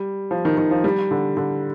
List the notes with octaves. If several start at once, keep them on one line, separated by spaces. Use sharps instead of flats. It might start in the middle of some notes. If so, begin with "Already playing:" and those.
Already playing: G3
F3
D#3
D#3
F3
G3
D3
D3